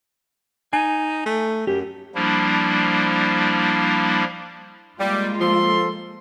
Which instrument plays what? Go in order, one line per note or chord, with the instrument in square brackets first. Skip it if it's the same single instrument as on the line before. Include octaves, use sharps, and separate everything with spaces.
[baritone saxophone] D#4 [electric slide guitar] G#5
[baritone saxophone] A3
[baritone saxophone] F#2 [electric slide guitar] G4
[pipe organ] F3 G3 A#3 D4 E4
[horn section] G3 [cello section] G#3 A#3 F4
[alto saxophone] F3 [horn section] A4 C6